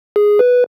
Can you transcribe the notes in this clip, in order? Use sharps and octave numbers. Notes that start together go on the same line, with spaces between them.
G#4
B4